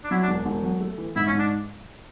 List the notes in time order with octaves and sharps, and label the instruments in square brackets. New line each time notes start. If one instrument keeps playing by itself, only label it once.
[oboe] D4
[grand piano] F#3 [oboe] E4
[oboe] D4
[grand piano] E1
E1
F#3
A3
E3
[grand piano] G#2 [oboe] E4
[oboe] C#4
[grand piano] G#2
[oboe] D4